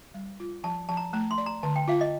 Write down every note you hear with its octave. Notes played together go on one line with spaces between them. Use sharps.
G3
F4
F3 A5
F3 A5
A#5
A3 A#5
C6
D5
A#5
D3 A5
G5
F4 F5
D#5